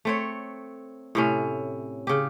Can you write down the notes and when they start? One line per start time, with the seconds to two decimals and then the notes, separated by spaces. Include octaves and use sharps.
0.05 A3 C4 C#5
1.15 A2 C3 C#4
2.07 C#3 G4